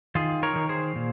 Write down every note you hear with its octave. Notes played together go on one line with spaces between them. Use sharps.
D#3 F4 G#4
A#4 C#5
D#3
G#4 C5
A#2